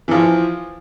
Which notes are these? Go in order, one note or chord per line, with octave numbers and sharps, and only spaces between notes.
E3 F3 F4